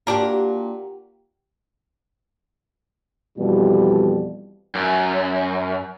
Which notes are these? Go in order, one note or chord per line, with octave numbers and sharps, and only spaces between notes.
A#2 D4 F#4 G4 A#4
F2 B2 E3 G3
F#2